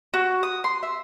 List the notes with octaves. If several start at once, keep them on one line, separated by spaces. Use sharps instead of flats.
F#4
D#6
C6
E5